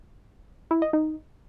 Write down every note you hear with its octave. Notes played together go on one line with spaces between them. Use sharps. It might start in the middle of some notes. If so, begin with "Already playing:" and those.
E4
D#5
D#4